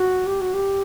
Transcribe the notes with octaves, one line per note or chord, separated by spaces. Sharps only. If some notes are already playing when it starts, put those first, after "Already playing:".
Already playing: F#4
G4
F#4
G4